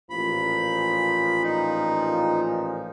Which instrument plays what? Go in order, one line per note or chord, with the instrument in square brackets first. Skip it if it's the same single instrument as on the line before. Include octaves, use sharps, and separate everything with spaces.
[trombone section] A1 A#2 F3 [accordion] B5
[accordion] D#4